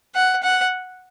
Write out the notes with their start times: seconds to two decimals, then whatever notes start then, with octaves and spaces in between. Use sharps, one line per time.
0.15 F#5
0.43 F#5